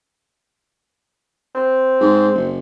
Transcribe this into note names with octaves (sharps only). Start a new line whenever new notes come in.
C4
G#2
F#1